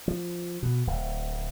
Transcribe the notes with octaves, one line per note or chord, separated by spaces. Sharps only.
F3
B2
D1